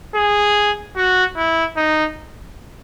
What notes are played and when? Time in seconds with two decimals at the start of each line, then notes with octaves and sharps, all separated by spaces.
0.15 G#4
0.96 F#4
1.37 E4
1.77 D#4